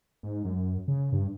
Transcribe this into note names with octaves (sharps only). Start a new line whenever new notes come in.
G#2
F#2
C#3
G2